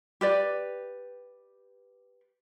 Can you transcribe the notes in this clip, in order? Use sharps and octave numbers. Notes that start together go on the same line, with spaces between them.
G4 B4 D5